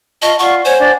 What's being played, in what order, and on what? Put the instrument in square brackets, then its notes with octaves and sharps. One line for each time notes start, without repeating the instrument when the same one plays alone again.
[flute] F4 [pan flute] D#5 [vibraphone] A5 C#6
[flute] F4 [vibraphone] D5 F#5 [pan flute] C#6
[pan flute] C5 [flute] C#5 [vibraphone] F#5 G#5
[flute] D4